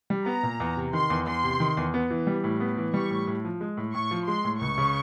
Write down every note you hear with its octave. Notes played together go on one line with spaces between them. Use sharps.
G3
B3 A#5
A#2
E2
C3
D#3 C6
E2
E2 C6
C3
D#3
E2
B3
E3
G3
A2
B3
E3
G3 C#6
A2
A2
F3
G#3
A2
A2 C#6
F3
G#3 C6
A2
C#2 C#6
C#3